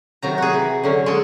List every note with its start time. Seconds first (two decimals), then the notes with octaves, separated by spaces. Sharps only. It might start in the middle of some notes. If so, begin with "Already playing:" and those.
0.22 C3 D#3 F#3 A#5
0.38 F#4 G#4
0.53 E3
0.83 D3 F#3 C#4
1.06 G#3 G#4 A4